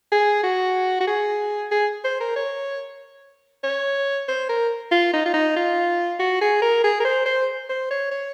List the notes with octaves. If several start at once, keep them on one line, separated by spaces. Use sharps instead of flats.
G#4
F#4
F#4
G#4
G#4
C5
A#4
C#5
C#5
C5
A#4
F4
D#4
F4
D#4
F4
F#4
G#4
A#4
G#4
A#4
C5
C5
C5
C#5
C#5